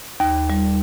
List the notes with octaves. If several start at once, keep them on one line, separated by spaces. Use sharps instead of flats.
D#2
G3